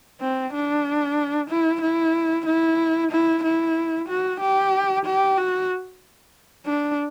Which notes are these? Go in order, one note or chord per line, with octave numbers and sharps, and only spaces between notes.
C4
D4
E4
E4
E4
E4
E4
F#4
G4
G4
F#4
D4